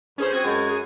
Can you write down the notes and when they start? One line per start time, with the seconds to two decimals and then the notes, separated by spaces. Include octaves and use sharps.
0.18 G2 C#4 G#4 C5
0.33 C4 F#4 D#6 G#6
0.44 F#2 G#3
0.69 G#4